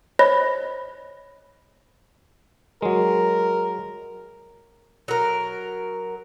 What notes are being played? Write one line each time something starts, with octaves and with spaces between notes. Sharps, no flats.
C5 C#5 D#5 B5 A#6
F#3 G#3 A#4
F#3 A#4